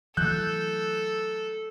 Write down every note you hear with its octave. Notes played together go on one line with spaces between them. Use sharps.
E3 F#3 A3 A4 F#6 G6